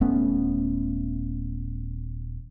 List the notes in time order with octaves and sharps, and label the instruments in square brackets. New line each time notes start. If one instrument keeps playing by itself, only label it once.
[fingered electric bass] D#1 A3 B3 C#4